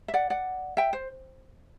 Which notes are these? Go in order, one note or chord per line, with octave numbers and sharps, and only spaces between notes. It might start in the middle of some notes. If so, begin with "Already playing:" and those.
E5
D5 F#5
D5 F#5
E5 G5
C5